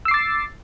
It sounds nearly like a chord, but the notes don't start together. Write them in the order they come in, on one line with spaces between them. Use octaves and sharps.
E6 C7 D6 A6